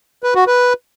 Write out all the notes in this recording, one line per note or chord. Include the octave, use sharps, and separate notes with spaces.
B4
F#4
B4